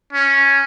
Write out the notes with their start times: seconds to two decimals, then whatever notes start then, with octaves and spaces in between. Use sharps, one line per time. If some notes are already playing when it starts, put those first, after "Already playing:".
0.13 C#4